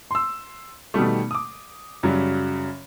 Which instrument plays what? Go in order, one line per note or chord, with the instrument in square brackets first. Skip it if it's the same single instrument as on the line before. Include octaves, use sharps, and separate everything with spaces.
[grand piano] C6 E6
B2 D#3 G3 A3
D6 D#6
F#2 C#3 F#3 G3